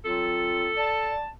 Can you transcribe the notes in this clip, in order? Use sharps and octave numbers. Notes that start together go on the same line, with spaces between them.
F#3 C4 F4 A4
D5 A5